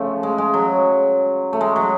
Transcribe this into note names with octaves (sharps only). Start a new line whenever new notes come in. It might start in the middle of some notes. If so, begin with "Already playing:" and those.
Already playing: C#3 F3 A3
G#3
G#3
F#3
A3
G#3
F#3